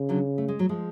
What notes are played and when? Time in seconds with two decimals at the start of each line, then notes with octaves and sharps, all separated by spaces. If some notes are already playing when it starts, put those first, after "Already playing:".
Already playing: C#3
0.09 D3 F#3
0.38 A3
0.48 G#3
0.59 F#3
0.69 F3 G#3